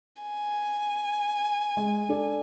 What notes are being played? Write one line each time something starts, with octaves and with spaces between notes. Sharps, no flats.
G#5
G#3
D4 A4 D5